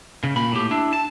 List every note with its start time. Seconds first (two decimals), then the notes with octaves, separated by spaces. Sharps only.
0.24 C#3
0.36 A#2 B5
0.52 A2 G4
0.71 D4 E4
0.93 A5